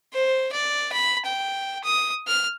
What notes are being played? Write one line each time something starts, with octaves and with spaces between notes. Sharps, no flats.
C5
D5
B5
G5
D#6
F6